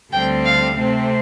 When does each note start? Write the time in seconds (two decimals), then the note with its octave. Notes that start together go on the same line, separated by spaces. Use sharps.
0.12 D2 D3 G3 C4 G5
0.45 F5
0.77 C3 A3 C4